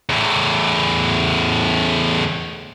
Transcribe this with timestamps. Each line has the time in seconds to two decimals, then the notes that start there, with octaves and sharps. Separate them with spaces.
0.09 E2 A2